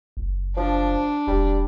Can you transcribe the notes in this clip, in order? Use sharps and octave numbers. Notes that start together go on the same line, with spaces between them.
F#1
F3 D4
E1 G3